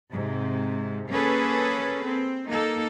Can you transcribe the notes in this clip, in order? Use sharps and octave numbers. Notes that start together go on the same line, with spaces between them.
G#2 C3
A#3 C#4 G#4 A4 B4
C4
A#3 D#4 A4